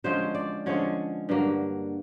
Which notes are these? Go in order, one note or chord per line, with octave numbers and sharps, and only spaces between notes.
D3 F3 G#3 C#4 C5
D5
D3 F3 G#3 C#4 C#5
G2 D3 F#3 A#3